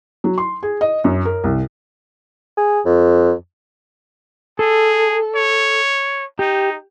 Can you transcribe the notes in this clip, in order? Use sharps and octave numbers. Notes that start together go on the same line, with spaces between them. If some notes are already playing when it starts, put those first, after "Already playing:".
F#3
C6
G#4
D#5
F#2
A#4
C2
G#4
F2
G#4 A4
C#5
D#4 G4